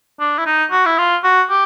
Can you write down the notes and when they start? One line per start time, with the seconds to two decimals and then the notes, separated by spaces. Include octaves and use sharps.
0.20 D4
0.38 E4
0.46 D#4
0.71 F#4
0.86 E4
0.98 F4
1.24 F#4
1.50 G4